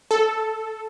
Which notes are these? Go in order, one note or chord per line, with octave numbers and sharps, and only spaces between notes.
A4